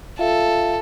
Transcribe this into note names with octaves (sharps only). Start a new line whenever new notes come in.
F4 A4 E5 F5